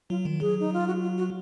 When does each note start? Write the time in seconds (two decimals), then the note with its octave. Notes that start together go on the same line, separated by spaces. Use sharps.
0.10 F#3 F4
0.25 D#3
0.40 F#3 G#4
0.60 D#4
0.73 F4
0.87 F#4
1.02 F4
1.18 F#4